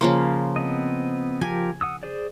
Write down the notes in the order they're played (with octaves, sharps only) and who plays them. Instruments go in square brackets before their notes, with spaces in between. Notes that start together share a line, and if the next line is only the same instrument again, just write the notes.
[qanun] C#3 F3 A#3 [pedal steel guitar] C6
[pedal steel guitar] B3 C4 D#5
[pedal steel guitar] F3 G4 A#4 [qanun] G#5
[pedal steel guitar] F#5 D#6 E6
G#4 C5 D5